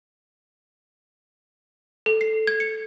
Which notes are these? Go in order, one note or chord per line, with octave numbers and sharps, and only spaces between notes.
A4
C7
G#6
C#7